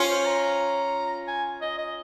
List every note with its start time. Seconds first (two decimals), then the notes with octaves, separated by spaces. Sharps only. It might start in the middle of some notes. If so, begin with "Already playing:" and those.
Already playing: C#4 F4
0.09 C5
0.26 A#5
0.43 A#5
1.27 G#5
1.62 D#5
1.78 D#5